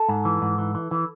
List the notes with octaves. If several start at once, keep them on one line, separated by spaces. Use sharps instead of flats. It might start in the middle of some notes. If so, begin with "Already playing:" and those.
Already playing: A4
G#2
E3
G#2
E3
E3
E3